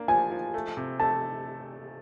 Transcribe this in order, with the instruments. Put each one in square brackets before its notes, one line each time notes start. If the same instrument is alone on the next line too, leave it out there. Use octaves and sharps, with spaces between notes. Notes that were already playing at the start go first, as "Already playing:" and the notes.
Already playing: [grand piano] A#3 D4
[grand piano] F3 [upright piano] G#5
[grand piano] F3
A3
C3
[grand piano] A3 [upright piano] A5